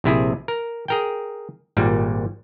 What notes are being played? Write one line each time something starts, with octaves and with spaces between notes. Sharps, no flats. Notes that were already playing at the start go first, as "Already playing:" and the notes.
A#1 C3 E4 G#4
A#4
G#4 A#4 G5
G#1 A#2 G3